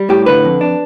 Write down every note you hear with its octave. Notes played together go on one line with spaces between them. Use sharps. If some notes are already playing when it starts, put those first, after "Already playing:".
Already playing: G3
A2 G4
D3 B4
F2
D4